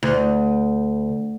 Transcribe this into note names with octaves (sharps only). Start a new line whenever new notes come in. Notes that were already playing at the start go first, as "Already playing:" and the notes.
D2